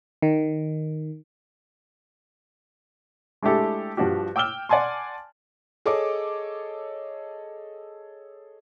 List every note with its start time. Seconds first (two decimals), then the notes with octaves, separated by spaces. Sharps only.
0.22 D#3
3.42 G#3 A3 D4 E4 G4 A4
3.97 G2 F3 D4 F#4 G4
4.36 G5 D6 E6 F6 G7
4.69 D5 F#5 G#5 A5 C6
5.86 G#4 A4 C#5 D#5 D6